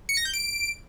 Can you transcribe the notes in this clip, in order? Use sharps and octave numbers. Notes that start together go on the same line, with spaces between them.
C#7
A#6
G6
D7